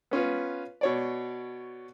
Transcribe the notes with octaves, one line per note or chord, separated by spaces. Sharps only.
B3 C#4 F4 B4
B2 C#5 D5